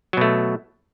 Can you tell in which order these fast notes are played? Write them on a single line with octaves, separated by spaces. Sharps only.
F#3 B2 A3